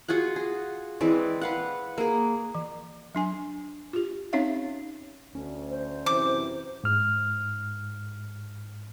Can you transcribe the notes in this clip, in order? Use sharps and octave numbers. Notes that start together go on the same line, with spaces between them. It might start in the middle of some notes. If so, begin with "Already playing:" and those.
F4 F#4 G#4 F#5
G#4
E3 G#3 C4 D5
B4 F5 F#5
A#3 G#4
E3
F#3 D4 G#5
F4 G4
C4 C#4 D#4 C#5 E5 F5
D2 C#4
C5
F#2 C3 E3 D6
G#2 F6